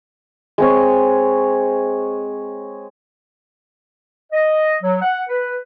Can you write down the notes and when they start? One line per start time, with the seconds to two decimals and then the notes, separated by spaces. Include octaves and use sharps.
0.58 G#3 C4 C#5
4.33 D#5
4.83 F#3
5.02 F#5
5.29 B4